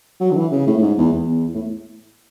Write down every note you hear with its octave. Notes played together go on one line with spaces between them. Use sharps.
F#3
D3
E3
C#3
A2
A2
G#2
E2
E2
A2